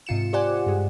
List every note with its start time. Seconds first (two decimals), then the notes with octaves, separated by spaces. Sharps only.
0.06 G#2 C3 F4 C#7 E7
0.33 G4 C5 D5 F#5 G#5
0.67 G2 G#3